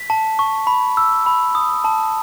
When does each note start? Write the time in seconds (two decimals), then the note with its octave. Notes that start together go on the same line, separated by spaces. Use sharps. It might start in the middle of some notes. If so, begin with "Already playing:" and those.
Already playing: B6
0.10 A5
0.39 C#6
0.67 B5
0.97 E6
1.26 B5
1.55 D#6
1.84 A5